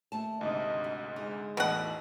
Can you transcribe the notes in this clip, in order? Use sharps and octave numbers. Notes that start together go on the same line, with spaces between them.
D#2 A3 A5
D2 G#2 C3 D#5
F#4
G#3 D#4
A1 E2 B2 A3 F#5